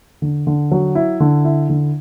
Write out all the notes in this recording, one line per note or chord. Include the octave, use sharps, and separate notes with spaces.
D3
D3
F#3
E4
D3
E4
D3